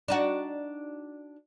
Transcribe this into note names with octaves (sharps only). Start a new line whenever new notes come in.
D4 D#4 F#4